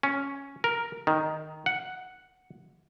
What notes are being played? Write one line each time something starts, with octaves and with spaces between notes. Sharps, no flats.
C#4
A#4
D#3
F#5